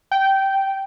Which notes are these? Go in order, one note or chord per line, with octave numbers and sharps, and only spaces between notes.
G5